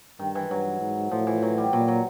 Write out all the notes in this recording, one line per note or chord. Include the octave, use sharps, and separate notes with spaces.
G2 D#3
E3
G2 F#3
G#2
A2 F3
E3
F#3
G3
A#2 F#3
F#3